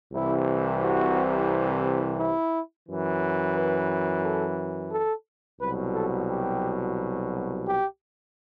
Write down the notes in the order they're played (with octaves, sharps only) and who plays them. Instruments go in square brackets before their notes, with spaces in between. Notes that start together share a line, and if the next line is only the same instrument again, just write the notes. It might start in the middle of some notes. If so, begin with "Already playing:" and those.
[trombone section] C2 C3 E3 E4
F#4
E4
F#2 E3
B4
A4
A4
C2 B2 F#3 B4
A4
G4
G4